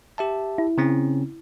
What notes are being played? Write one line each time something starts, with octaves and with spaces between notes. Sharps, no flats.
G4 E5 A5
E4
C#3 C4 C#4